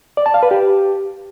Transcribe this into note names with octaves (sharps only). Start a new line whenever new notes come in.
D5
A5
F5
B4
G4